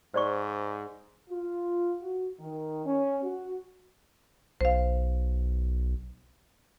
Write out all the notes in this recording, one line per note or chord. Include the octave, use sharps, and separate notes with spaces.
G#2 C5 D5 C#6
F4
F#4
D#3
C#4
F#4
B1 C5 F5